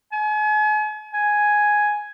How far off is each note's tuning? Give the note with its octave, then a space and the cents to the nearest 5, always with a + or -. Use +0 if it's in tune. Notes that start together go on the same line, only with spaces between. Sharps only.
G#5 +40
G#5 +5